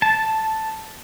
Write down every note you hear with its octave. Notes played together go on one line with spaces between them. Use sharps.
A5